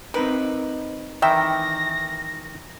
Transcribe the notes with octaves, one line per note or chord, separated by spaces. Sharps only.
C4 D#4 A#4 B4
D#3 E3 E5 G5 A#6